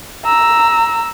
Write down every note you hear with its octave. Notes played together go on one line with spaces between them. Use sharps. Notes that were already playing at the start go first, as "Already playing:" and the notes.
A#5 E6